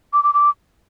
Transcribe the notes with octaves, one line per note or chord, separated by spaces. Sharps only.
D6
D6
D6